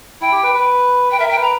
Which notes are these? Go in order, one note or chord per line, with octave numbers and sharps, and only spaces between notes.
E4 G5
G4
B4
B4
B4 G5
A#4 E5
G5
B4
A#5